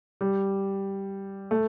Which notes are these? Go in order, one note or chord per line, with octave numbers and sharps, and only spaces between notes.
G3
A3